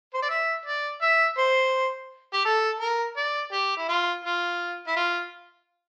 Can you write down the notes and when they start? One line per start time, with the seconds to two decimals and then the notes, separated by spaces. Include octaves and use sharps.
0.14 C5
0.22 D5
0.29 E5
0.65 D5
1.01 E5
1.38 C5
2.33 G4
2.45 A4
2.80 A#4
3.17 D5
3.52 G4
3.77 E4
3.88 F4
4.25 F4
4.87 E4
4.96 F4